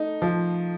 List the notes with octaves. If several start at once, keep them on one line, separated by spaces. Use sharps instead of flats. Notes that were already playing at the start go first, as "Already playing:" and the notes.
Already playing: A3 D#4
F3